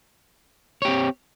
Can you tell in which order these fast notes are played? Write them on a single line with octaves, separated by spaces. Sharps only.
C#5 G4 C4